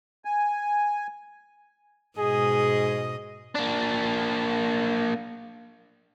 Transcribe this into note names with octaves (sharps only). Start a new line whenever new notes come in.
G#5
G#2 B2 G#4 D#5
A#3 D4